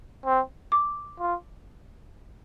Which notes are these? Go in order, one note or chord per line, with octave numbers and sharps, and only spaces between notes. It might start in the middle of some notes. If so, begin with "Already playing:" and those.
C4
D6
F4